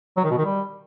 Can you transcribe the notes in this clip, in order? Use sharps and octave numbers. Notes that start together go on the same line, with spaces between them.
F#3
D#3
B2
D#3
G3